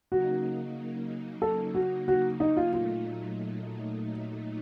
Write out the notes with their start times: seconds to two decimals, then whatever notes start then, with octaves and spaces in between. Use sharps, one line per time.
0.11 C#3 F#3 A#3 D#4 F#4
1.42 A4
1.75 F#4
2.08 F#4
2.40 D#4
2.57 F4
2.73 A#2 F#3 A3 D#4 F4